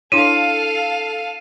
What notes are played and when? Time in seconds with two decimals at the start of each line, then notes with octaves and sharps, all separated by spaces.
0.12 D4 E4 A4 C#5 F5 D#7